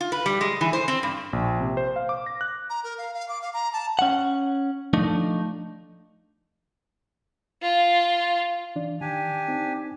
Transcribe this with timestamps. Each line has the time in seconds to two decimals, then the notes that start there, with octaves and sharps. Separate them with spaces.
0.01 F4
0.12 B4
0.26 G3
0.41 G#3
0.61 E3
0.73 C5
0.88 C4
1.03 G2
1.33 A#1
1.61 C3
1.77 C5
1.96 F5
2.09 D6
2.26 A#6
2.41 F#6
2.70 A#5
2.84 A#4
2.98 F5
3.14 F5
3.29 D6
3.42 F5
3.54 A#5
3.73 A5
3.99 C#4 F#5
4.93 F3 A3 D4 D#4
7.62 F4
8.76 E3 D4 D5
9.01 D#3 D4 G4 G#5
9.48 C4 D#4